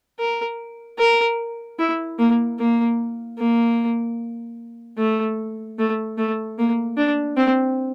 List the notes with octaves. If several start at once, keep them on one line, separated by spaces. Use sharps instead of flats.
A#4
A#4
E4
A#3
A#3
A#3
A3
A3
A3
A#3
D4
C4